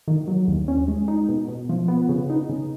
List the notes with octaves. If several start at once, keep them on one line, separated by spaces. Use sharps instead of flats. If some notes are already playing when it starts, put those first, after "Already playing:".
D#3
F#3
D#2
C#4
G#3
D#4
B2
B2
F3
B3
C#3
D#4
C#3